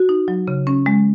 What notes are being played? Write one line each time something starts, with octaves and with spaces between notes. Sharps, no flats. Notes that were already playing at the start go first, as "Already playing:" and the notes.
Already playing: F#4
D#4
F#3
C#3
C#4
G#3